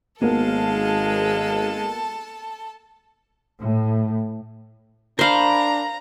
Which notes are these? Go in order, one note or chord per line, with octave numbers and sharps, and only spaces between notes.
G#1 G#3 A#3 B3 A4 A#4 F5 A5
A2
D4 A#4 C5 F5 A#5 B5